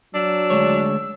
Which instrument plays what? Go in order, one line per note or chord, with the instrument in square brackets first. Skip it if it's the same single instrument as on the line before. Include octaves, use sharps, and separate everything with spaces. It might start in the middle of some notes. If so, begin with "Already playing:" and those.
[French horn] F#3 [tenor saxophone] D4 [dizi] E6
[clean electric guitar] D2 G#3 C#5